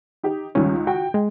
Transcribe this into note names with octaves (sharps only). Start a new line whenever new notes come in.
D#4 G4
C#2 D#3 G3 C#4
F#4 G5
G#3